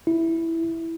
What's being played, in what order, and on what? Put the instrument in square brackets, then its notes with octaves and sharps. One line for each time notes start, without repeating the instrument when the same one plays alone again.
[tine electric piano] E4